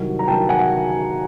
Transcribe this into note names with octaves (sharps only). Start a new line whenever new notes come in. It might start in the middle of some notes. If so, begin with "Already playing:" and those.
Already playing: C2 C3 D#3 F#3
A#5
C2 C3 D#3 F#3 G5 A5
F#5 G#5